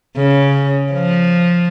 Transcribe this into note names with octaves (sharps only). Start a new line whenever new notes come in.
C#3
F3